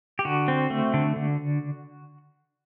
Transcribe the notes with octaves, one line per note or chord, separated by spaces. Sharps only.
G4
D3 F#4
C4
A3
D3
D3